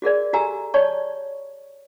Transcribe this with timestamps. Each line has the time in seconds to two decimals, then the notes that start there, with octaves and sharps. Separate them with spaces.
0.02 F#4 G#4 A#4 D5
0.33 F#4 G4 A4 G#5 A#5 E6
0.74 C#5 D5 A5 C#6